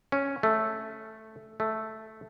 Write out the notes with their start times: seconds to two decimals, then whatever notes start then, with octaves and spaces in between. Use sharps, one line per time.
0.12 C#4
0.43 A3
1.60 A3